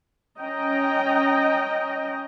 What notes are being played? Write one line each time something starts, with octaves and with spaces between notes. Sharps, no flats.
C#4 D#5 G5 A#5